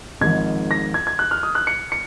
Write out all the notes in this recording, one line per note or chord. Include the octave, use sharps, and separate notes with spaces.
G#1 G#2 F3 G#6
A#6
G#6
G#6
F#6
F6
D#6
F#6
C#7
C#7